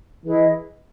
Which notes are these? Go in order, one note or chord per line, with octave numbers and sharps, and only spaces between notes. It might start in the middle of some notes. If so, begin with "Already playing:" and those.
E3 E4 G#4 B4 D#5